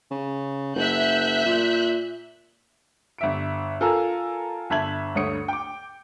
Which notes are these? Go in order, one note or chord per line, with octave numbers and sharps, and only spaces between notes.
C#3
F#1 E5 F#6 G6
A#2
G1 E5 D7
F4 A4 A#4 G#5 A#5 E6
G1 E5 A5 G#6 F#7
D2 G2 A3 C#5 D#6 C#7
G5 D6